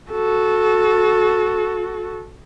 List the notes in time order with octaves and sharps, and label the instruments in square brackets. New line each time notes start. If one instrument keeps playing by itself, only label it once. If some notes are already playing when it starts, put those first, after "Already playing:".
[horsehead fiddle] F#4 A4